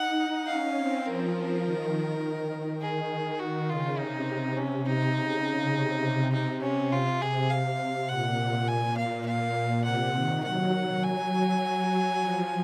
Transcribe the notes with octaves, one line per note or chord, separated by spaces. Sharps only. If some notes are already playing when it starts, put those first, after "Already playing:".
Already playing: D#4 F#5
C#4 F5
C4
F3 A#4
D#3
D#3 G#4
D#3 F#4
C#3 F4
C3 D#4
C#4
D#4
C#3
C3
D#4
C#4
F4
G#4
C3 F5
A#2 F#5
G#5
F5
F5
C3 F#5
D#3
F#3 F#5
G#5
F3